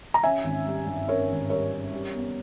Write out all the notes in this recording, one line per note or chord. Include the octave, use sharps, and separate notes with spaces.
A#5
C#4 E5 G#5
G#1
G3
G2
C#4 A#4 C#5
G#1
G3 A#4 C#5
C#4
G3
B3